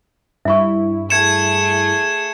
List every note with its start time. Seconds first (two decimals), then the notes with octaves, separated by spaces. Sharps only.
0.45 G2 E4 E5 C#6
1.10 A3 G#4 G#6 C#7 E7